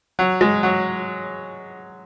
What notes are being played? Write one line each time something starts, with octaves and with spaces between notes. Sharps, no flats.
F#3
G#3
F#3